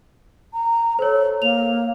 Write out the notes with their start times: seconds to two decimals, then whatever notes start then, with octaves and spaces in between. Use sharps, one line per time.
0.53 A#5
0.99 A4 C5 C#5
1.42 A#3 F7